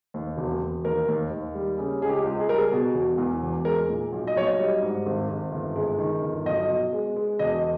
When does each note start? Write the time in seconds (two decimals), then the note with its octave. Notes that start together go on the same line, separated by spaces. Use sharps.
0.14 D#2
0.37 E1
0.61 E1
0.84 D#2 A#4
1.08 D#2
1.30 D#2
1.54 G3
1.78 C#3
2.02 C#2 G#4
2.09 G4
2.24 C#2
2.40 G#4
2.48 G3 A#4
2.58 G#4
2.72 B2
2.95 E1
3.18 E2
3.42 E1
3.65 G#3 A#4
3.89 A#2
4.12 B1
4.27 D#5
4.36 B1 C#5
4.47 D#5
4.59 G3
4.82 G#2
5.06 G#1
5.28 G#1
5.52 G1
5.76 G#3
5.98 D#3
6.22 G1
6.46 B1 D#5
6.68 B2
6.93 G#3
7.16 G#3
7.39 E1 D#5